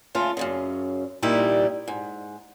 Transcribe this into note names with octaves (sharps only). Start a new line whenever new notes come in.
C#3 A3 F4
F#2 A2 C#3
A#2 G3 D#4 E4 G4
G#2